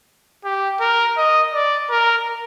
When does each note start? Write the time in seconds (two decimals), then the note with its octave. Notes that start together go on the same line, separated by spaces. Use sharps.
0.44 G4
0.80 A#4
1.17 D#5
1.54 D5
1.90 A#4